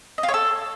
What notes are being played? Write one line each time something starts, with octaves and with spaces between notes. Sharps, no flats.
D#5
F4
C#5
A4